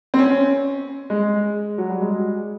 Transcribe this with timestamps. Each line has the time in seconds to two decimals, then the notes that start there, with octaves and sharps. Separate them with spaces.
0.14 C4
0.19 C#4
1.10 G#3
1.78 F#3
1.89 G3
2.01 G#3